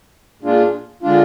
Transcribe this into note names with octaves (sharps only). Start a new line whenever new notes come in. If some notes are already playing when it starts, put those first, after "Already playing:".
A#2 G#3 D4 F4
D3 G#3 D4 F4